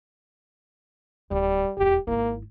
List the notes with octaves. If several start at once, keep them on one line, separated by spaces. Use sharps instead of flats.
D1 D#2 G3
D#1 E2 G4
G#1 A#3 E4